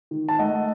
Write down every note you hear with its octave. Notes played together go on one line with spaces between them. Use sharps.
D#3
A5
A3 D#5 F#5